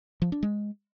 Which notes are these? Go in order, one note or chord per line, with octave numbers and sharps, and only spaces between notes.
F3
D4
G#3